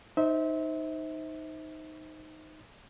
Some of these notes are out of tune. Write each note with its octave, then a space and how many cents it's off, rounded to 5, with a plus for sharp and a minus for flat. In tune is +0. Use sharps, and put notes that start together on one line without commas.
D#4 +0 C5 +0 E5 -30